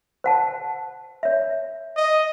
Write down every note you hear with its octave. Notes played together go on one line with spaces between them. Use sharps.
C5 F#5 A5
C#5 E5
D#5